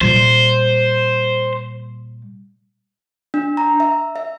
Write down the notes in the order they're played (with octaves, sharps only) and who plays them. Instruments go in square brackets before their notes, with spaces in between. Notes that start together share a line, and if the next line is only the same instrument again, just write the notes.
[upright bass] A#2 G3 [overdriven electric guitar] C5
[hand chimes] D4
A#5
E5
E5